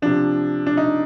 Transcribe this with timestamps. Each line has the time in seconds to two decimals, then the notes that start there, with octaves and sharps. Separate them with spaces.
0.02 C3 F3 D4
0.66 D4
0.77 D#4